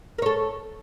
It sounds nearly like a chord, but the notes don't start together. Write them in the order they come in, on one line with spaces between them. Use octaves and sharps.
A#4 C#5 A4